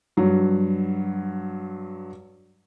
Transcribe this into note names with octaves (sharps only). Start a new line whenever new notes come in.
G2 F#3